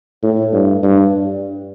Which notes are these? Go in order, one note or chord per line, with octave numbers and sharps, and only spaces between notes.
A2
G2
G2